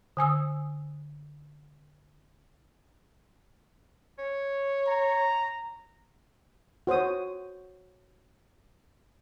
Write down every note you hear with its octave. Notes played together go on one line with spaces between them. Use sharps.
D3 G#5 D#6 E6
C#5
A#5
F#4 C5 C#5 D#6